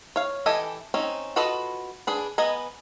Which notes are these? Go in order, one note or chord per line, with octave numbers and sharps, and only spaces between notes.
C#5 F5
E3 G4 A4 D#5 G#5
C4 C#4 D#4
F4 F#4 A4 B4 D#5
D4 G#4 B4
B3 B4 D#5 G#5 A#5